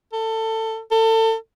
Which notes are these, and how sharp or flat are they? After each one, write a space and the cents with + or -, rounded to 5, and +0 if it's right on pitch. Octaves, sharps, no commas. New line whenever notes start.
A4 +20
A4 +30